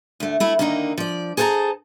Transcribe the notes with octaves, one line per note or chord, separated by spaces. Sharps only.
D2 A3
A3 E4
D3 D#3 A#3 D4 D#4
F3 D5
G#4 A4 C5 D#5 A5 A#5